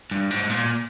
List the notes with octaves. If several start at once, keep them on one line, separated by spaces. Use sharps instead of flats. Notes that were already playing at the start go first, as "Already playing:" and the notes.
G2
G#2
G#2
A#2